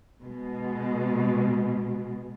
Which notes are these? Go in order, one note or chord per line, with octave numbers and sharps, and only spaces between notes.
B2 G#3